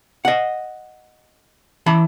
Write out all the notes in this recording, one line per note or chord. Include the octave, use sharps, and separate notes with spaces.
D#5 F#5
E3 A5 B5